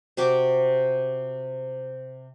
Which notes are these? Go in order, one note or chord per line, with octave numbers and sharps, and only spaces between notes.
C3 F#4 G4 D6